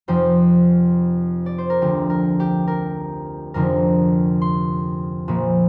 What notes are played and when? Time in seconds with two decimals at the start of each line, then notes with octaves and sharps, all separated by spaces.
0.08 F1 F2 F3 C5
1.46 D5
1.58 C5
1.70 A#4
1.81 D2 D3 F3 G4
2.10 A#4
2.40 G4
2.67 A#4
3.54 F1 F2 D3 F3 A#4
4.42 C6
5.28 A#1 A#2 F3